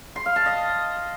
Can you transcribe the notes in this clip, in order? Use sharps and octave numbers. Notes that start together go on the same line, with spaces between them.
C6
F5
A5
D#5